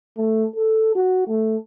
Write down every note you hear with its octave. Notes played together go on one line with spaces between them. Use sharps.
A3
A4
F#4
A3